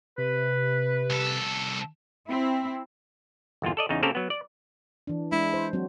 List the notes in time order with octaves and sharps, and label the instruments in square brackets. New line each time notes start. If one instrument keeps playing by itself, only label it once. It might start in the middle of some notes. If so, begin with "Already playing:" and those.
[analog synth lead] C3 [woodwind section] B4
[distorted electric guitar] C2 A4
[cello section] C4 E4
[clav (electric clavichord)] G1 E2 A#2 F4
A4 D5 D#5
E2 C#3 D#4
C#3 A#3 C4 G4 A4 A#4
F#3 B3
D5
[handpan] E3 D4
[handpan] G#3 D4 [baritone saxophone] E4
[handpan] C5
F#3 C4 F#4